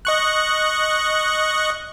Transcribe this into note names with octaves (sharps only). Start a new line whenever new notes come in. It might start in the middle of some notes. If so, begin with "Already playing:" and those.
D#5 C#6 F#6